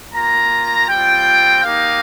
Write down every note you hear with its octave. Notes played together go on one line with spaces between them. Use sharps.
A#3 F4 A#5
G3 C4 F4 G5
A#3 D#4 G4 F5